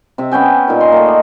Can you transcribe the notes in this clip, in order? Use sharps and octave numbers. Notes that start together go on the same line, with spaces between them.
C3 C4 E5
B3 C#4 G5 G#5
A#2 D#4 A#4
C6
A3 A#3
D5 D#5